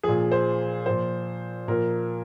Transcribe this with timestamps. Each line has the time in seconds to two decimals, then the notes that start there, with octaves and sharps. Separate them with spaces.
0.03 A#2 F3 G#4
0.32 C5
0.86 A#2 F3 C5
1.68 A#2 F3 A#4